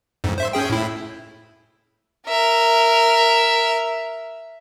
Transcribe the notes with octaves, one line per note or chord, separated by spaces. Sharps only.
F2 G#2
C5 E5
C#4 G#4 G5
A2 E4
A#4 E5